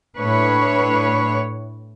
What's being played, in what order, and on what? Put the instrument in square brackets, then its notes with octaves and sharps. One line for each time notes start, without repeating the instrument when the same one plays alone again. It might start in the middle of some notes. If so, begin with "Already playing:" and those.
[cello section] A2 D4 B4 C#5